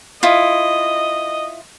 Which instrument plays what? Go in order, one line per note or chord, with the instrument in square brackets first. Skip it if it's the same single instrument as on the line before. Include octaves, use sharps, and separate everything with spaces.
[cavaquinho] E4 F4 [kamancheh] D#5